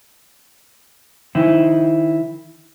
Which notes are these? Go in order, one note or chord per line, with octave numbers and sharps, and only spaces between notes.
D#3 D#4 E4 C5